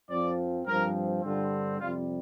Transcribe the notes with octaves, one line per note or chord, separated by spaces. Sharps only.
F2 F3 C4 D5
G2 F3 C4 A#4
G2 D3 G3 C4 F4
F2 C3 G3 F4